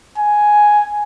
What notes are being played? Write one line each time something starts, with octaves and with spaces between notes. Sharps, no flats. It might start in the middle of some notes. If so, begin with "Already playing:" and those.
G#5